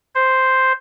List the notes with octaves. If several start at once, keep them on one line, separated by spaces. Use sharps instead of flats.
C5